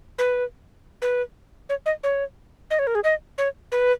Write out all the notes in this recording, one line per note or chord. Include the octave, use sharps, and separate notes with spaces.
B4
B4
C#5
D#5
C#5
D#5
C#5
A#4
G#4
D#5
C#5
B4